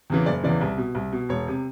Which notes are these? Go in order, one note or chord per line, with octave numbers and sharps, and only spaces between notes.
E2 C#3 E3
F#1 D5
E2 C#3 E3 D5
C2
B2
C2
B2
E1 C#5
C3